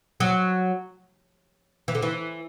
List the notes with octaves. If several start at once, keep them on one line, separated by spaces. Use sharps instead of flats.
F#3
E3
D3
E3